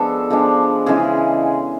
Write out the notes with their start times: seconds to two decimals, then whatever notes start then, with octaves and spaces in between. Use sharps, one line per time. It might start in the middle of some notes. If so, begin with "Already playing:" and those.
Already playing: F3 G#3 B3 D4 A4
0.30 F3 G#3 B3 D4
0.86 C#3 E3 G#3 G#4